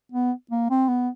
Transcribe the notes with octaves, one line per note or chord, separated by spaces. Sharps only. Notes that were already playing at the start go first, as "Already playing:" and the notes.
B3
A#3
C4
B3